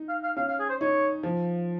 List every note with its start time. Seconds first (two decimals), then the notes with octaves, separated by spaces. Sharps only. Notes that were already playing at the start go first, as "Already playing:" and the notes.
Already playing: D#4
0.09 F5
0.23 F5
0.37 C#4 F5
0.48 F5
0.59 G#4
0.69 C5
0.80 D#4 C#5
1.23 F3